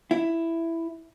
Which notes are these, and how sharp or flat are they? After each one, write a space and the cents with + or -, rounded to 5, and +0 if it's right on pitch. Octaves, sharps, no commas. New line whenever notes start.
E4 +5